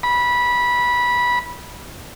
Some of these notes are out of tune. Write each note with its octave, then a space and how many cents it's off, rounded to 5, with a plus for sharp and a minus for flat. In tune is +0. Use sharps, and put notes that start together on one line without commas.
B5 -15